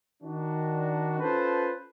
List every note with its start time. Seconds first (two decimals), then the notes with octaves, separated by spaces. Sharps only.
0.22 D#3 D4 F#4
1.20 C#4 F4 A4 B4 C5 A5